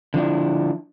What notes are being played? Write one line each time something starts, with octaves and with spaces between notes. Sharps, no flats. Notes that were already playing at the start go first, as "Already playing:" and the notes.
D3 F3 D4 E4